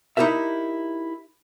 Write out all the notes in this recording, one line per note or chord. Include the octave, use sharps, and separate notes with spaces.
D#4 E4 G4 A#4 E5